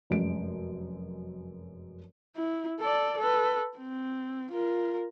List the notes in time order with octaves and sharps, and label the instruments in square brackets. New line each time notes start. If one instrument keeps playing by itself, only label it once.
[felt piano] F1 F#2 G#3 D7
[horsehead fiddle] E4
A4 D5
A4 B4
C4
F4 A#4